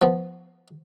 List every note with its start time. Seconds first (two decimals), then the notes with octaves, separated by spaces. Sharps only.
0.02 F3 B3